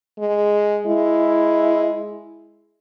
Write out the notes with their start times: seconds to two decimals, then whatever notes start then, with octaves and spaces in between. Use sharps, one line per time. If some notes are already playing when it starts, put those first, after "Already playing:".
0.19 G#3
0.86 G#3 E4